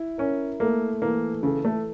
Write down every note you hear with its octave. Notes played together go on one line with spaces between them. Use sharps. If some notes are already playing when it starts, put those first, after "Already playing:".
Already playing: E4
C#4 A#4
A3 A#3
E3 A#3
C#3 A4
A3